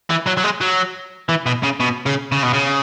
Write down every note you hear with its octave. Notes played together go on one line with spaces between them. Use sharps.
E3
F#3
F#3
G#3
F#3
E3
B2
C#3
B2
C#3
C#3
B2
C#3